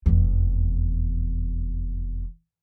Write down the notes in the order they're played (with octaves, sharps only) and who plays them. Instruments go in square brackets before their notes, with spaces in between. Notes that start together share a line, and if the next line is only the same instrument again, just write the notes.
[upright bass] F1 E2